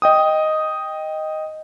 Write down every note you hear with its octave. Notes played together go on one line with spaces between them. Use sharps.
D#5 G5 D#6